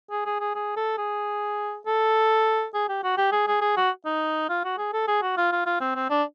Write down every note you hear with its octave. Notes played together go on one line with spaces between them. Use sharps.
G#4
G#4
G#4
G#4
A4
G#4
A4
G#4
G4
F#4
G4
G#4
G#4
G#4
F#4
D#4
F4
F#4
G#4
A4
G#4
F#4
F4
F4
F4
C4
C4
D4